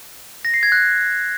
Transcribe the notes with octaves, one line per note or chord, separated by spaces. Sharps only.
A#6
C7
G#6
F#6